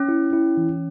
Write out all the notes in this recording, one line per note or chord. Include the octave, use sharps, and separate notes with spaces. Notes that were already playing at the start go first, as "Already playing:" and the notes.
Already playing: C#4
E4
E4
E3